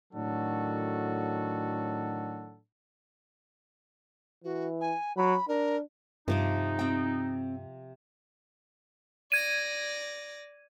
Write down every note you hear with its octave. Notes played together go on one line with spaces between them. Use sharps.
A2 D#3 F#3 D4 F#4 A4
E3 F#4
G#5
F#3 B5
D4 A#4
G2 C3 F3 D#4 D6
C4 G5
D5 G#6 A#6 D#7